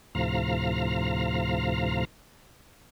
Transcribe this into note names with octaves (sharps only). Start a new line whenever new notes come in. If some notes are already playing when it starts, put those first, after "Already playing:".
D2 A2 C3 F3 F5 A#5